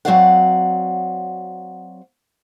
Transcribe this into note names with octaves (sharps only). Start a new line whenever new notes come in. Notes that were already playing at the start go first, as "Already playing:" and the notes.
F#3 C4 F#4 D5 F5 F#5